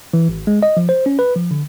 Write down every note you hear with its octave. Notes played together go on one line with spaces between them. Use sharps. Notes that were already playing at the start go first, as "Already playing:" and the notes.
E3
G#1
G#3
D#5
F3
C5
C#4
B4
F3
D3